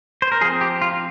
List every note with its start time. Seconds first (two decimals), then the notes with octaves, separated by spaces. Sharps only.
0.22 C5
0.32 A#4
0.41 F3 G#4
0.45 C4
0.61 G4
0.82 F4